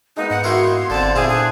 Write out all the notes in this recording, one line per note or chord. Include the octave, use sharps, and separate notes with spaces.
G#3 A#3 B3 D#4
G#2 F#5
D#4 E4 F#4 G4 A#4 C6
G1 D3 C4 A5
A#2 C4 E4 F4 G#4
D4 G#4 B4